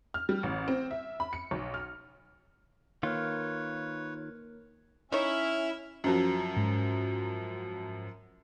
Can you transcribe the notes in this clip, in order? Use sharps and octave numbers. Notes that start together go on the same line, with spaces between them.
F6
G3
A1
C4
E5
B5
C#7
B1
F6
D#3 A#3 F4 A#4 B4 C#5 F6
C#4 D#4 E4 C#5 E5 F6
F#2 F3 F#3
G#2